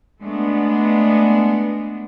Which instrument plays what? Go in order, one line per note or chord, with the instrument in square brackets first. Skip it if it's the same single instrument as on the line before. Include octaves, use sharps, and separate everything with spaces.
[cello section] G#3 A3 B3 D4